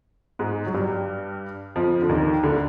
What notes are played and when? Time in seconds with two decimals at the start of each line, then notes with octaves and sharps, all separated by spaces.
0.39 G#2 G#3
0.66 F#3
0.74 G2 G3
1.76 F2 F3
2.02 D3
2.09 D#2 D#3
2.43 D2 D3